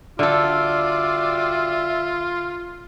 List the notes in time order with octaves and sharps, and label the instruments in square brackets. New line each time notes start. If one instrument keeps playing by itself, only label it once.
[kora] D3 A4 [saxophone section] G3 F#4 D5 [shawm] F4 [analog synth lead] E5